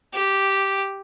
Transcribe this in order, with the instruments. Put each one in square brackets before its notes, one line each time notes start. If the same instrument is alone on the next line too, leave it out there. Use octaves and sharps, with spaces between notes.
[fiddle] G4